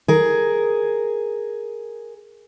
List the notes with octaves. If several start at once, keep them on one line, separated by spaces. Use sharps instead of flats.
G#4 A#4